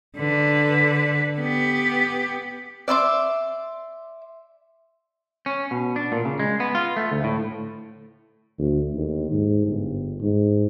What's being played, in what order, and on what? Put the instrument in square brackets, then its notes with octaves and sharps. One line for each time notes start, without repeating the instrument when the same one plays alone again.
[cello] D3 B4
B3 G4
[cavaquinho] D5 E5 C6 D6
[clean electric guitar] C#4
B2
D4
A#2
C#3
G#3
B3
F4
A3
D2
A2
[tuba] D2
D#2
G#2
G1
G#2